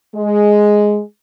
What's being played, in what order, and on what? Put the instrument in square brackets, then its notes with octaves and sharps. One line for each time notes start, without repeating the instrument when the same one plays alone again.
[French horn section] G#3